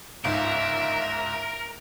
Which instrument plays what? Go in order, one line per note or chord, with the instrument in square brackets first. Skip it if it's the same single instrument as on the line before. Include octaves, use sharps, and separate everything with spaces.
[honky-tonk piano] G1 C#2 G#2 [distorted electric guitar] A#4 [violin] E5